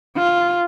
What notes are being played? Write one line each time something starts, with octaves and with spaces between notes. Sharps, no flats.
F4